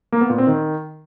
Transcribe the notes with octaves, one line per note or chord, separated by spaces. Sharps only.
A#3
B3
A#2
C4
D#3